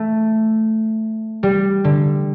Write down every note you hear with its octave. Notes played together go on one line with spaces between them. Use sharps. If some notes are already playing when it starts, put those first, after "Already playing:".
Already playing: A3
G3
D3